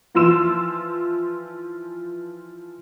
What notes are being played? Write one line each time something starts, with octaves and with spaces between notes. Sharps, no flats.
E3 F3 F4 C6 E6 E7